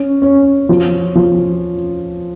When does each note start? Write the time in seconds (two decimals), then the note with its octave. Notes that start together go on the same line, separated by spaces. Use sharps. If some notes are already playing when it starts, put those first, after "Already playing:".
Already playing: C#4
0.22 C#4
0.69 F3
1.15 F3